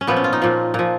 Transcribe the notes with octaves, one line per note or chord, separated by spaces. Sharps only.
C#4
A#2 F3 B3
C#4
F4
D#4
A#2 F3
A#2 F3